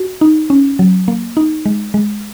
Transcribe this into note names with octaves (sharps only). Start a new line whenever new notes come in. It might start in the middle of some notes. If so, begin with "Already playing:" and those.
Already playing: F#4
D#4
C#4
F#3
A#3
D#4
G#3
G#3